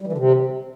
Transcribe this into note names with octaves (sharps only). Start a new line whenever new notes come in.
G3
E3
D3
C3